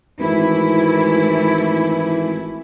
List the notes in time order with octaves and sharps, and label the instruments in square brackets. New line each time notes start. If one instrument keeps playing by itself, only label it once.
[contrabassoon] G#1 [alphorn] E3 [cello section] A3 E4